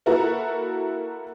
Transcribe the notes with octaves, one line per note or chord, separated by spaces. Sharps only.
A#3 E4 F#4 A4 A#4